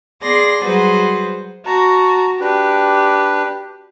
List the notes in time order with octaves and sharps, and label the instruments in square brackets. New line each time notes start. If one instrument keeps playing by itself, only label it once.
[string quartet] B3 G#4 D5 C6 A#6
F#3 G3 F#4 G#4 B4 C5
[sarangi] F#4 [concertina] A5 A#5
[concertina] D4 B4 [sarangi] G4